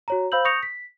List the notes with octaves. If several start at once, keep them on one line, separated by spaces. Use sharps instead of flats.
F#4 C#5 A#5
C5 F5 B5 E6 G6 F#7
C#6 D#6 G6 A#6 C#7 F7
B6